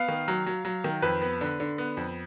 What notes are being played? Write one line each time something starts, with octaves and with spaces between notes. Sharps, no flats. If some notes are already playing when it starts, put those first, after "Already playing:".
Already playing: B3 F5
D#3
F#3
F#3
F#3
D#3
F2 B4
B3
D3
D3
B3
F2